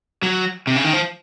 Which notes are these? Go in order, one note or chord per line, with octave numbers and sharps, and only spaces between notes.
F#3
C3
C#3
D#3
F3